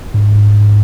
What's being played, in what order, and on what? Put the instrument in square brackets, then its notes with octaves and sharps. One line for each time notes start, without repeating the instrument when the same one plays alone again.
[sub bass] G#2